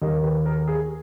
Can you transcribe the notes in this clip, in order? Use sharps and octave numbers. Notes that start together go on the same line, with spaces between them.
D#2 D#3 A#3 D#5
B4
A#4
G#4